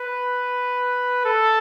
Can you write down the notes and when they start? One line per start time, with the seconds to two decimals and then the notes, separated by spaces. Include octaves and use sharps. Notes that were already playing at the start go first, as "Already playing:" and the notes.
Already playing: B4
1.25 A4